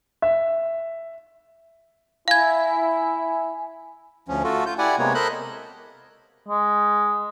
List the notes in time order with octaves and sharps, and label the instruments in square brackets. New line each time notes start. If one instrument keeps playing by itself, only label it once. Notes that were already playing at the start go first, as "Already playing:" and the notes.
[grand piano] E5
[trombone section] E4 [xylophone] F5 G#6 [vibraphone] G#5
[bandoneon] D2 F3 C#4
A3 F4 F#4 A4
F4 G6
E4 G4 D5 F#5 G#5
C3 G#3 A#3 B3 C#5
A4 A#4 C5 D#5 B5 F#6
[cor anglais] G#3